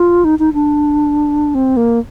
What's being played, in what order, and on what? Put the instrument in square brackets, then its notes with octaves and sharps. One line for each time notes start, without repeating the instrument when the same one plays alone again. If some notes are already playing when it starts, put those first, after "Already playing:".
Already playing: [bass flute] F4
D#4
D#4
D4
C4
A#3